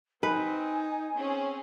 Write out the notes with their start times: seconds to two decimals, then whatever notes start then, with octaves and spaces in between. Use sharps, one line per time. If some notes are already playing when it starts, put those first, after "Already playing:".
0.23 C4 D#4 B4 G#5
1.14 C4 C#4 G#4